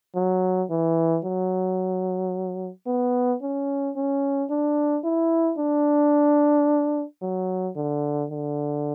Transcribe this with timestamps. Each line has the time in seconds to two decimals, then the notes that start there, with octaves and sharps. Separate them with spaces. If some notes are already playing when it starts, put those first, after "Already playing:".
0.15 F#3
0.70 E3
1.24 F#3
2.86 B3
3.42 C#4
3.96 C#4
4.50 D4
5.04 E4
5.58 D4
7.21 F#3
7.76 D3
8.30 D3